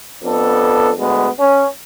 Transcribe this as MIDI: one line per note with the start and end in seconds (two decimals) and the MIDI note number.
0.23 0.92 41
0.23 0.92 59
0.23 0.92 62
0.23 0.92 69
0.99 1.28 38
0.99 1.28 56
0.99 1.28 59
1.39 1.66 61